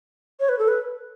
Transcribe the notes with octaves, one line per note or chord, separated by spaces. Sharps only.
C#5
B4
A4
B4